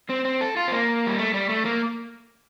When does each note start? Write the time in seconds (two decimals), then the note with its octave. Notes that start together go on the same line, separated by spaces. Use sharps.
0.09 C4
0.25 C4
0.41 A4
0.57 F4
0.68 C4
0.72 A#3
1.07 G3
1.19 A3
1.34 G3
1.49 A3
1.65 A#3